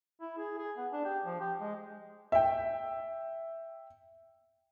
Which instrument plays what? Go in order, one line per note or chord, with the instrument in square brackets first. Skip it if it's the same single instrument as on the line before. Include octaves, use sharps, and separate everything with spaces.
[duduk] E4
G#4
G#4
B3
D4
G4
F3
G4
G#3
[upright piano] E5 G5